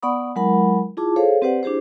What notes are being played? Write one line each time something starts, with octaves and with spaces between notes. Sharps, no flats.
B3 D5 F#5 B5 C#6 D#6
F#3 G#3 E4 A#4 F#5 B5
E4 F4 G#4 A5 D6
G#4 A4 C5 C#5 F5
C4 G4 B4 C5 D5 F#5
D4 E4 G4 G#4 C5